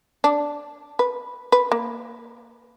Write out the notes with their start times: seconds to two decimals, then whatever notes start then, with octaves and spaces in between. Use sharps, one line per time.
0.24 D4
0.99 B4
1.52 B4
1.72 A#3